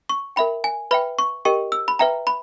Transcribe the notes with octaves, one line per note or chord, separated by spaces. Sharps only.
C#6
A#4 E5 G5 B5
G#5
B4 E5 G5 B5
C#6
G4 A#4 D#5 G5 C#6
E6
B5
B4 E5 G5 A#5
B5